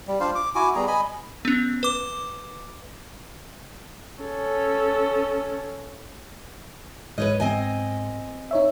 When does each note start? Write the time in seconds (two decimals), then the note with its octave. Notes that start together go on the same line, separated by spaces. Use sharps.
0.07 G3
0.20 D4 F4 C5 F5
0.35 D6
0.55 E4 F#4 G#5 D6
0.76 G3 B3 G#4 A#5
0.87 D#5 G#5 B5
1.45 B3 C#4
1.83 B4 D6
4.23 C#4 A4
7.18 G#2 B4 C#5 D#5
7.40 C4 D#5 G#5
8.51 D#4 C#5 E5